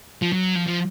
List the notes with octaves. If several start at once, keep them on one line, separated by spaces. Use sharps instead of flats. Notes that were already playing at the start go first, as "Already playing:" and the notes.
F3
F#3
F3
F3